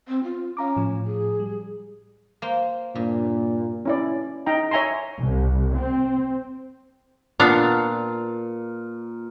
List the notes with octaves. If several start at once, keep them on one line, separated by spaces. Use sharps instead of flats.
C4
F4
C#4 F5 A#5 D6
A2 F3
G#4
G3
A#3 C5
G2 A#2
C#4 E4 D5
D#4 G5 A#5
C#5 E5 G#5 A#5 C6
C2
C4
A#2 B3 D4 F5